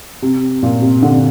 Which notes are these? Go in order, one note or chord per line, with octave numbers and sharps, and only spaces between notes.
C3
A#2
C3
D3